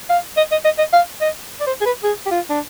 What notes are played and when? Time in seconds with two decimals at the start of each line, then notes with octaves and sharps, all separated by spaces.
0.09 F5
0.37 D#5
0.52 D#5
0.65 D#5
0.79 D#5
0.93 F5
1.21 D#5
1.60 D5
1.67 C5
1.81 G#4
1.86 B4
2.03 G#4
2.26 G4
2.31 F4
2.50 D4